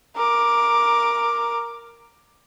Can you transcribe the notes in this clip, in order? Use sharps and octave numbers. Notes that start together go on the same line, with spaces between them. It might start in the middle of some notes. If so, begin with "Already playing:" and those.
A#4 D6